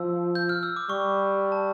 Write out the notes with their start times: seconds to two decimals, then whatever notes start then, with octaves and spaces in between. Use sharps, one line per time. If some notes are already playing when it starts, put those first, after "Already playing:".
Already playing: F3 E6
0.35 G6
0.49 F6
0.63 E6
0.76 D6
0.89 G3 C#6
1.52 A5